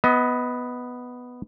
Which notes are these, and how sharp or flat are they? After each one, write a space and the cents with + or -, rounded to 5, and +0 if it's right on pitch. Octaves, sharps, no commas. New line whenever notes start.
B3 +0 D#5 +30